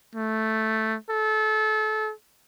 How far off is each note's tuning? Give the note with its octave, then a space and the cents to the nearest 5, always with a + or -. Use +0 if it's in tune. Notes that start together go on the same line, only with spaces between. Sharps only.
A3 +0
A4 -30